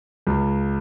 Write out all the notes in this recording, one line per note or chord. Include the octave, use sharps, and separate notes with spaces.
C#2